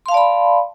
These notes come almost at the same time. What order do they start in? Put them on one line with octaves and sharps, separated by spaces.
C6 F5 A5 D5 B5